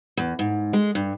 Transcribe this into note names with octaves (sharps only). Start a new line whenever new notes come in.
E2
G#2
G#3
G2